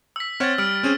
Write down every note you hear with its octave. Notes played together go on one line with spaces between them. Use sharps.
E6 B6
C4 C#5 F#5 F6 A6
G3 E6 F6 D7
C4 C#4 G#4